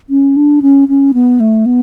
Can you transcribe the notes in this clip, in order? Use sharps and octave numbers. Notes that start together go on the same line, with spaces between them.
C#4
D4
C#4
C#4
B3
A3
B3